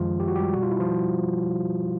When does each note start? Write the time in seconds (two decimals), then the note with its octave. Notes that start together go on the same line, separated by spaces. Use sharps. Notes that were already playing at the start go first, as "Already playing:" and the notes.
Already playing: F#2 D#3 F3 G#3 F4
0.20 G4
0.28 F#4
0.36 G3 G4
0.53 B2 G3 F#4
0.63 F4
0.71 E4
0.80 F3 F4